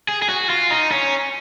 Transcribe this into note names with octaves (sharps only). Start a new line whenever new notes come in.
G#4
G#4
F#4
F4
D#4
C#4